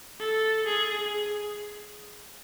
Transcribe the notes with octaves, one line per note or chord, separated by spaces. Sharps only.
A4
G#4